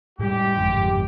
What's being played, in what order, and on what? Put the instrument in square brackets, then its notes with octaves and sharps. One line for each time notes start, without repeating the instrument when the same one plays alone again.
[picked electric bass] A2 G3 [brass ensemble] G#3 G4
[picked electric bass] G1 F2 G#2